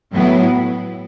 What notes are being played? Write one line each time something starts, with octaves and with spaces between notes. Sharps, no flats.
A2 F#3 B3 E4